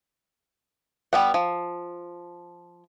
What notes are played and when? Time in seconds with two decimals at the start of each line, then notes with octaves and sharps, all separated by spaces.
1.13 G3 B3 F#5
1.34 F3